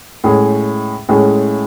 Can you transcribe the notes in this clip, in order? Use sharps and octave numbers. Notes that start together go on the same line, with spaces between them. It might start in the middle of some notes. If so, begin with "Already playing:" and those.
A2 G#3 C#4 G#4
A2 G#3 C#4 G#4